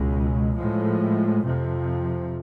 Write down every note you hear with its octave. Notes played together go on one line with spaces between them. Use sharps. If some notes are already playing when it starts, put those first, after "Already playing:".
Already playing: C#2 B2 G#3
A2 F3 G#3
F2 C3 F3